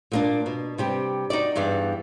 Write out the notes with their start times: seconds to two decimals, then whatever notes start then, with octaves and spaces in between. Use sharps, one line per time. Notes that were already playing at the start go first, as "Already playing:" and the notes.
0.12 A#2 A#3 D4
0.46 B2
0.78 C3 G3 G4
1.30 D#4 F#4 D5
1.56 E2 G2 E3 D5